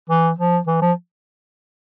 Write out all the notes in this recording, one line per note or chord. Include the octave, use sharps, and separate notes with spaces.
E3
F3
E3
F3